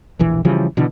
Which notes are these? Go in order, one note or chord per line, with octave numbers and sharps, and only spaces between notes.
E1 A#1 E3
C#3 E3 F3 G3
B2 D3 E3